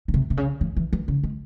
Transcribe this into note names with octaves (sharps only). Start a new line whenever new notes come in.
C#3
C3
C3
C#3
E3
E3
E3
C#3
G#3